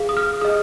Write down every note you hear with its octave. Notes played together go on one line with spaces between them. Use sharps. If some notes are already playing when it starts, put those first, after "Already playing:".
Already playing: G#4 F5
D#6
F6
G#4 D#5 D#6